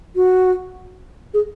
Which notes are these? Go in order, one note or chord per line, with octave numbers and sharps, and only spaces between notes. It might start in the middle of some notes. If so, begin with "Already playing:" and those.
F#4
G#4